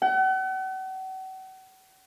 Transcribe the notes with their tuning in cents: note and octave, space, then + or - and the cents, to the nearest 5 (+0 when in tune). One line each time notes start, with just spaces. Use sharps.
F#5 +40